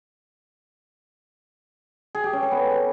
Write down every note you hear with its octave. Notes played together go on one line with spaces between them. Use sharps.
G#4
G4
C#4
A4
B3